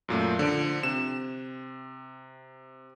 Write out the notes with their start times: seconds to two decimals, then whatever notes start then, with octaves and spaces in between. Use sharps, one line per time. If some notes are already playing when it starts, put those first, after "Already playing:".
0.08 F#2 A#2 A3
0.39 D3 F3 D7
0.83 C3 E7